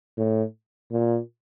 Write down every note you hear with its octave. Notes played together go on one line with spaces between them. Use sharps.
A2
A#2